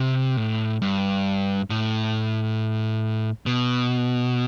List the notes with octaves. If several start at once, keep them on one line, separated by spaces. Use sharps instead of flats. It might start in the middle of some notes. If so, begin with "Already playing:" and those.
Already playing: C3
A2
G2
A2
B2